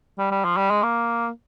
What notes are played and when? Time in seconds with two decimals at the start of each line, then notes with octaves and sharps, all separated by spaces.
0.18 G3
0.31 G3
0.45 F3
0.57 G3
0.70 G#3
0.83 A#3